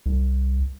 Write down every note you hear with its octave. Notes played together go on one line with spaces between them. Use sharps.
C2